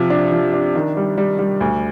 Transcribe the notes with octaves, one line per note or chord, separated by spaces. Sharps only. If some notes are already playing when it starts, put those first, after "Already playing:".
Already playing: C3 F3
D4
F3
D4
D#3
G3
G3
G3
D2